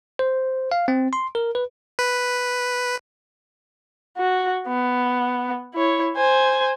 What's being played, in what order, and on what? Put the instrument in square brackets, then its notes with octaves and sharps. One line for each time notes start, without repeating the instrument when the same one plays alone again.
[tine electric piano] C5
F5
C4
C6
A#4
B4
[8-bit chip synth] B4
[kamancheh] F#4
B3
E4 C#5
C5 G#5